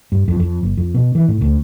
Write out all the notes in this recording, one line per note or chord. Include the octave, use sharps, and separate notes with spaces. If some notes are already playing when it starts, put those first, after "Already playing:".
G2
F2
F2
F#1
F2
B2
E3
A2
D2